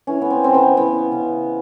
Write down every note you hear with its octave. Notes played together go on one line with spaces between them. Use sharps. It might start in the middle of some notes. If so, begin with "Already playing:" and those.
E3 C#4
B3
C4
C#3 C4
B3
E3 B3
C#3